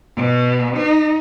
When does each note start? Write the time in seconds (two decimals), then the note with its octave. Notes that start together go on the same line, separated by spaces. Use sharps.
0.16 B2
0.77 D#4